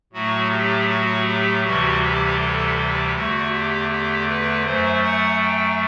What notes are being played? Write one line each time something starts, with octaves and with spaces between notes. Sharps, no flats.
A2 F#3 A3 F#4
G4
F#4
G4
D2 C3 E3 G3 F#4
G4
A4
G4
E2 D3 A3 F#4
G4
G4
B4
F#2 F#3 A3 C5
F#5
G5